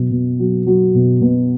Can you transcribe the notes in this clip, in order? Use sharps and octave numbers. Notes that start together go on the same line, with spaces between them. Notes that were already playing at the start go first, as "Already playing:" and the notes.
Already playing: B2 F#3
B2
F#3
F#3
B2
B2